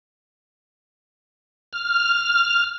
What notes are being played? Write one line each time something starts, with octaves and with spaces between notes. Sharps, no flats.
F6